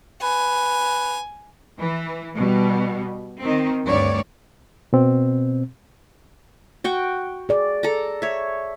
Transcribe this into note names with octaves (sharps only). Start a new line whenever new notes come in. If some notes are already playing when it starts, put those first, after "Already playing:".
B4 G#5
E3
B2 G3
D#3 C4
D2 G2 A3 C#5 D5
B2 C4
F#4 G5 C#6
G#4 D5
A4 A#5
C#5 E5